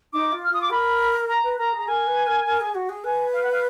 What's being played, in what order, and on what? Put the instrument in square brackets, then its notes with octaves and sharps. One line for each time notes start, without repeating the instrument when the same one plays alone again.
[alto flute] D#4 [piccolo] D6
[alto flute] F4
[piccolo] F6
[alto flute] F4 [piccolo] D#6
[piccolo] D6
[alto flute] A#4 [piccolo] B5
[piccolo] A#5
[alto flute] B4
[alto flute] A#4 [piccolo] A#5
[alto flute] G#4
[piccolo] A#5
[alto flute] A#4 [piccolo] G#5
[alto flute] B4
A#4
A#4
G#4
F#4
G#4
[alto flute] B4 [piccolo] G#5
[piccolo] F5
F#5
F5